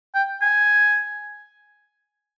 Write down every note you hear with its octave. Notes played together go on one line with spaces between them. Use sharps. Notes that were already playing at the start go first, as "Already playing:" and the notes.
G5
G#5